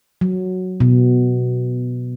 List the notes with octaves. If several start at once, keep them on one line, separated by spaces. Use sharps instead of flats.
F#3
B2